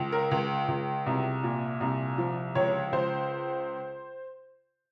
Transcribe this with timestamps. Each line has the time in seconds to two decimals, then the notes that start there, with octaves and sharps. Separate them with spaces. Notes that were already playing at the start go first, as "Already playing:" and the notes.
Already playing: C#2
0.12 A#4
0.31 C#2
0.68 C#2
1.06 C2
1.43 A#2
1.81 C2
2.18 F3
2.55 C#2 C#5
2.92 C#2 C5